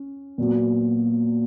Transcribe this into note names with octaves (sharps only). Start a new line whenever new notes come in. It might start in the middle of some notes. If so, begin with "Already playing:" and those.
Already playing: C#4
A#2 F#3 B3